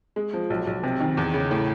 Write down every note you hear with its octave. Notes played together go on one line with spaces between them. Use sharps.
G#3
F3
B1
B1
C3
D#3
E2
C#3
A2